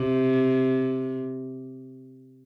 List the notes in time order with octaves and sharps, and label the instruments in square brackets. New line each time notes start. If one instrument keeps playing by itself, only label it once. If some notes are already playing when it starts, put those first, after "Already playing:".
Already playing: [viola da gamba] C3